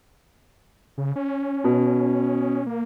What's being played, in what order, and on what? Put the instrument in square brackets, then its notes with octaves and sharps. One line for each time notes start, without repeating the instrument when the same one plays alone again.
[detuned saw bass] C#3
C#4
[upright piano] B2
[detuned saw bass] A#3